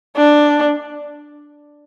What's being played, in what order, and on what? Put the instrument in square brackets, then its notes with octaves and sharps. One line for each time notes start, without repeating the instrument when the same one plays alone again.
[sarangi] D4